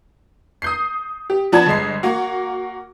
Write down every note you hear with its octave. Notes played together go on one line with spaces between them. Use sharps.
D#6 G6 C7
G4
F3 B3 D5 A5 B5 G#6
G1 G#3 D#5 C7
A#3 F#4